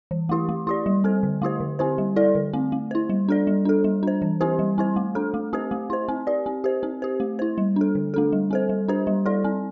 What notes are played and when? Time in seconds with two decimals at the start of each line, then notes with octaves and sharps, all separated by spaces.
0.11 E3
0.29 A3 E4 G4
0.49 A3
0.67 E4 G4 D5
0.86 G3
1.04 C4 A4 C5
1.23 D3
1.42 A3 E4 G4 C5
1.60 D3
1.79 C4 E4 G4 C5
1.98 G3
2.16 E4 A4 D5
2.35 D3
2.53 A3 C4
2.72 A3
2.91 E4 C5
3.10 G3
3.28 D4 A4 D5
3.47 G3
3.65 D4 A4
3.84 G3
4.03 D4 C5
4.22 E3
4.41 C4 E4 G4 C5
4.59 G3
4.78 C4 E4 C5
4.96 A3
5.15 D4 A4
5.34 A3
5.53 C4 G4 C5
5.71 A3
5.90 E4 C5
6.08 C4
6.27 G4 D5
6.46 C4
6.64 G4 C5
6.83 C4
7.02 G4 C5
7.20 A3
7.39 E4 C5
7.58 G3
7.76 D4 A4
7.95 D3
8.14 A3 D4 A4
8.32 G3
8.51 C4 A4 C5
8.69 G3
8.88 D4 G4 C5
9.07 G3
9.26 E4 A4 D5
9.44 C4